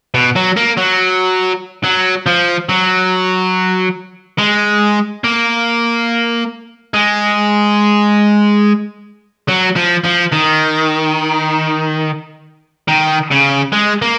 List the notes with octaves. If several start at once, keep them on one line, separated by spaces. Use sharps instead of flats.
B2
F#3
A#3
F#3
F#3
F3
F#3
G#3
A#3
G#3
F#3
F3
F3
D#3
D#3
C#3
G#3
A#3